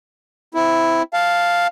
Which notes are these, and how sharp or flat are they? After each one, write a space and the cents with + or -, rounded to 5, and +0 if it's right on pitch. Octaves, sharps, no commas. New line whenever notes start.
C4 -25 E4 +0
F5 +0 A5 +0